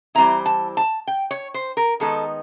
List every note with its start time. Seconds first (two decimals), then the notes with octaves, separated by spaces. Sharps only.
0.15 E3 G3 C4 E4 A#5
0.46 A5
0.77 A5
1.07 G5
1.31 C#5
1.54 C5
1.77 A#4
2.00 D#3 G#3 B3 D#4 A4